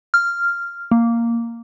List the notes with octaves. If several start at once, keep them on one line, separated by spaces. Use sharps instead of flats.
F6
A#3